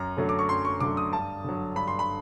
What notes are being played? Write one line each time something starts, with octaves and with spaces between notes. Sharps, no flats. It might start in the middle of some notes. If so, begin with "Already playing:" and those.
Already playing: F#2 A#5
D3 F#3 A3
D6
C#6
F#2 C6
C#6
D3 F#3 A3 D6
D#6
G2 A5
D3 F#3
G2 B5
C6
B5